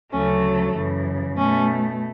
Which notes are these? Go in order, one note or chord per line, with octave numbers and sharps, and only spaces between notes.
D2 C#3 F#3 A3 C#4
F#2 C#3 E3
B2 A3 C#4